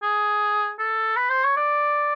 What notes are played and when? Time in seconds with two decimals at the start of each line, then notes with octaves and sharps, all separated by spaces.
0.03 G#4
0.79 A4
1.17 B4
1.30 C5
1.44 C#5
1.57 D5